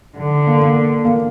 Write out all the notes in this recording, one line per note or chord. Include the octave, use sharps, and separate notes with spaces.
D3
A#3
A#3
A#3